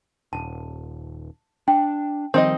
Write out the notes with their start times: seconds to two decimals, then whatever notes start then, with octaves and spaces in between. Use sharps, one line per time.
0.33 D#1 A5
1.68 D4 G5
2.34 D#3 F3 G3 C4 D#4 D#5